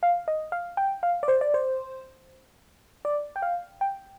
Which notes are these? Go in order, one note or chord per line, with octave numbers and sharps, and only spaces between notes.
F5
D#5
F5
G5
F5
D5
C5
D5
C5
D5
G5
F5
G5